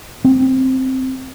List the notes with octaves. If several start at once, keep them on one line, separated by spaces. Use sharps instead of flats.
C4